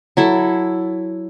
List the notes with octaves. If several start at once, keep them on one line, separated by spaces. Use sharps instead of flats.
F#3 E4 A4